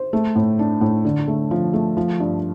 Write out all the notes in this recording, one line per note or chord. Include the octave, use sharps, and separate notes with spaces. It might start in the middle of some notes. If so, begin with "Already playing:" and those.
Already playing: C5
A3
A2
D4
A2
D3
A3
F3
A3
F3
G2